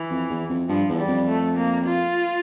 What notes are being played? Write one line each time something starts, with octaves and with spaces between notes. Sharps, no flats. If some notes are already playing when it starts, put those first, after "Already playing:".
Already playing: E3
F2
E2
F2
G2 F3
E2
G3
F2
A3
A#3
F4